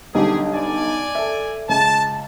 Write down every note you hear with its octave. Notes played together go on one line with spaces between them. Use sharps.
B1 D3 G3 G4 G#4
D5 G#5
A4 E5
C#2 A5